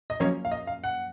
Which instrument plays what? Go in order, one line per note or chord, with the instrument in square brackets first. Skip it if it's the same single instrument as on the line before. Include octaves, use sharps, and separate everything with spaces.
[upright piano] D#5
[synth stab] F#2 F3 A#3 C#4 [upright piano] C#5
[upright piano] F5
D#5
F5
F#5